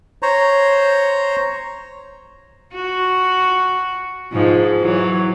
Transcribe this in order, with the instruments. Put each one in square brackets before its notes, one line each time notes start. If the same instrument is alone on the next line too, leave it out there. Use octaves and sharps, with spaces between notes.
[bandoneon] C5 C#5 A#5
[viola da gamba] F#4
G#2 F3
E3 F#3